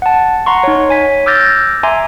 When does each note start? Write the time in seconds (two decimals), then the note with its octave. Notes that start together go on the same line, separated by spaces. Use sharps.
0.02 F#5 A5
0.46 F#5 A#5 C6 C#6
0.63 D#4 C#5
0.89 C#5 G#5 B6
1.26 D6 E6 F6 G6 A6 A#6
1.83 E5 G#5 A#5 C6 D6